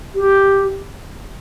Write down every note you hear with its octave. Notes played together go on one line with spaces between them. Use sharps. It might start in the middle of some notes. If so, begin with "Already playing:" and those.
G4